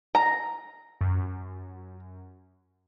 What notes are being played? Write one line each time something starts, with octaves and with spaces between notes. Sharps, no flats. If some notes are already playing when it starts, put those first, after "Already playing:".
A#5
F#2